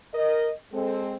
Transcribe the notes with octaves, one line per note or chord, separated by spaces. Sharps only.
A#4 D#5
G#3 C4 A4